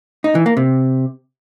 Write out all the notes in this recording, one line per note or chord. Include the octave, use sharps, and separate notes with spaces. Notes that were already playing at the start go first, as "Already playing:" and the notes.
D#4
E3
A#3
C3